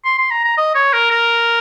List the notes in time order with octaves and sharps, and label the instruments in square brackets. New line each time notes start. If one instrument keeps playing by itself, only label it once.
[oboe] C6
C6
A#5
A#5
D#5
C#5
A#4
A#4